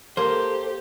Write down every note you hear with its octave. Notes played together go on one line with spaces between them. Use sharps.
A#3 G4 A4 C5